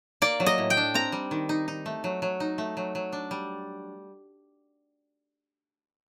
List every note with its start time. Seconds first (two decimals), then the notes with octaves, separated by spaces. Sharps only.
0.22 A#3 D5
0.40 F#3
0.46 D#5
0.58 A2
0.70 G5
0.77 D4
0.94 C4 A#5
1.12 G3
1.31 D#3
1.49 D#4
1.68 D#4
1.86 A3
2.04 F#3
2.22 F#3
2.40 D#4
2.58 A3
2.77 F#3
2.95 F#3
3.13 D4
3.31 G3